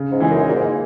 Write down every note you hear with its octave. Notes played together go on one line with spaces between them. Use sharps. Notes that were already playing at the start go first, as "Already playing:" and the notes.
Already playing: C#3
G#2
E3 G#3 D#4 G#4
F#2
A#2 A#3
G#2